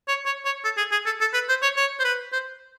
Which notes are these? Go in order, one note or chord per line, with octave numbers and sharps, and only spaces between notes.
C#5
C#5
C#5
A4
G#4
G#4
A4
A4
B4
C5
C#5
C#5
C5
B4
C5